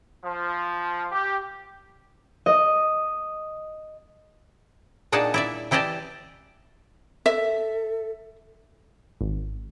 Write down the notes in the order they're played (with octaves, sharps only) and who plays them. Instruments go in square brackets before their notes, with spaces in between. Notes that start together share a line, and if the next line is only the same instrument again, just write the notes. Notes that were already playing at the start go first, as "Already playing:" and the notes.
[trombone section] F3
G4
[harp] D#5
[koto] A#2 D4 D#4 G#4 F#5 A5
E4 D5 E5
E3 E4 G4 D5 D#5 A5
[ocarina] A4 [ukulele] E5
[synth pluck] G#1